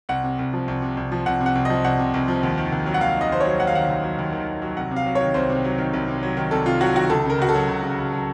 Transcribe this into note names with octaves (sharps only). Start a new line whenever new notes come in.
C2 F#5
C3
C2
F3
C2
C3
C2
F3
C2 F#5
C3
F#5
C2
F3 D#5
C2 F#5
C3
C2
F3
D#2
D#3
D#2
F#3
F#5
D#2 F5
D#3 D#5
D#2 C5
F#3 C#5
D#2 F#5
F5
D#3 F#5
D#2
F#3
D#2
D#3
D#2
F#3
C2 F#5
C3
F5
F#3
C#5
D#3
C2 C5
C3
F#3
D#3
C2
C3
F#3
D#3
C2 A4
C3 F4
F#3 F#4
D#3 F#4
C#2 A4
C#3 A#4
C#2 F#4
A4
F#3
C#2
C#3
C#2
F#3